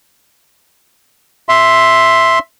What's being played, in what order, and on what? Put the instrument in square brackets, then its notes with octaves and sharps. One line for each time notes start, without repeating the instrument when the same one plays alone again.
[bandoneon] E5 C6